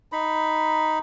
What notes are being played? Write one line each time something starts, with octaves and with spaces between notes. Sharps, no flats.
D#4 B5